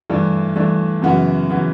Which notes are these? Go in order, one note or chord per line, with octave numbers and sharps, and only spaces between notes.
G2 E3 A3 D4
G2 E3 A3 D4
F#2 C#3 E3 B3 F#4
C#3 E3 B3 F#4